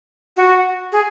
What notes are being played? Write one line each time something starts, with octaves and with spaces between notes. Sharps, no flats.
F#4
G#4